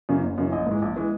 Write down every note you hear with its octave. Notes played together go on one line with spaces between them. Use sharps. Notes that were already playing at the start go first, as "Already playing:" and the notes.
F#2 C#3 E3
F#1
F#2 C#3 E3
A#1 D#5
G#2 E3 G#3
A#1
E3 G#3